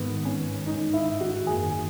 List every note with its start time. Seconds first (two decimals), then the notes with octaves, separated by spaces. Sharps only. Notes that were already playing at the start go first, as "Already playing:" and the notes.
Already playing: G#2 D#3 G#3 B3
0.25 C#4
0.66 G#2 D#3 G#3 D#4
0.94 E4
1.21 F#4
1.47 F#2 D#3 A#3 G#4